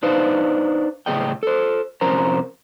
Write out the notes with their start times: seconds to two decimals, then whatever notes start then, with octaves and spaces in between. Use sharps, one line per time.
0.03 D4 D#4 B4 C5 F5
1.06 A2 C#3 C4 G#4 D#5 G5
1.43 A4 C5
2.01 F2 C3 C#4 A#4 C5 A#5